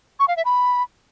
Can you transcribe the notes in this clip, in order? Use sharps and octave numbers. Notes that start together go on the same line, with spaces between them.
C#6
F5
E5
B5